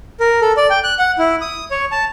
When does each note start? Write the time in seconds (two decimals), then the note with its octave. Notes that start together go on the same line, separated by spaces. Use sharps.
0.20 A#4
0.41 A4
0.57 D5
0.70 G5
0.84 F#6
0.99 F#5
1.19 E4
1.41 D#6
1.71 C#5
1.92 A5